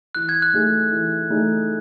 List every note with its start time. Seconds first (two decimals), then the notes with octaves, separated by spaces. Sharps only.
0.15 E3 F#6
0.29 G#6
0.42 F#6
0.53 A3 D#4 G#4
0.92 E3
1.30 A3 D#4 G#4